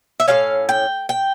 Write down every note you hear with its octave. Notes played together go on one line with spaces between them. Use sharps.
E5
A2 F3 C#4 F5
G5
G5